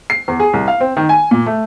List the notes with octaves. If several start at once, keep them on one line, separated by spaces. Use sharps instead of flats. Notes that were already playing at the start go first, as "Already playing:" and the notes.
C7
E2
G#4
C2
F5
C4
D#3
G#5
A#2
A3